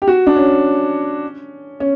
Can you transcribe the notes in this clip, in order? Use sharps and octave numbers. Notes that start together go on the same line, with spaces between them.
G4
F#4
D4
C#4
C#4